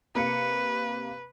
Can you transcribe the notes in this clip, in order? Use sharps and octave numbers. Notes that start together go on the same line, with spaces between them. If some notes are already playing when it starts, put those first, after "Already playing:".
C3 A#3 B4 C#7